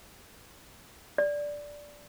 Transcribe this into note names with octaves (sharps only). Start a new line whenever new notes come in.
D5